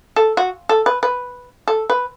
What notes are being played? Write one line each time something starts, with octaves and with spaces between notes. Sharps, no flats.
A4
F#4
A4
B4
B4
A4
B4